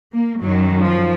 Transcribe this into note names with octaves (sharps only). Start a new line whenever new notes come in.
A#3
F#2 D#3 F#3
F3